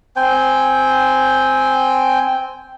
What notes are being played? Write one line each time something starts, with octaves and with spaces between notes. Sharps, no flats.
C4 C5 G5 G#5